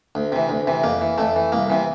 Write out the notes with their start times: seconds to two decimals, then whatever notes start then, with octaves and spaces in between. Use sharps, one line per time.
0.15 D2
0.32 C3 E3
0.49 D2
0.67 C3 E3
0.83 F2 A#3
1.01 E3
1.18 F2 A3
1.36 E3
1.52 C2 A#3
1.70 C3 E3